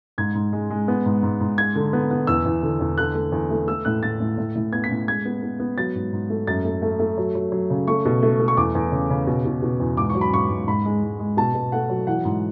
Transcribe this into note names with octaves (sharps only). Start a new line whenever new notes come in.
G#2 G#6
G#2
G#3
G#3
B3
G#2
G#2
G#2
G#3 G#6
D3
B3
B3
E2 E6
E2
D3
E2
D3 F#6
A3
E2
A3
A3 E6
A2 F#6
A2 A6
A2
A2
A2
B3 G#6
B6
A2
G#3 G#6
B3
B3
B3
F#3 A6
G#2
G#2
A3
F#2 A6
A3
A3
A3
F#3
F#3
F#3
C#3
A3 C#6
B2
A3
A3
C#6
E2 D6
E2
C#3
C#3
B2
B2
B2
E2
G#2 D6
C#6
F#3
B5
G#2 C#6
G#2
G#2 B5
G#3
G#2
G#3
B2 A5
B2
A3 F#5
F#3
E3 F#5
G#2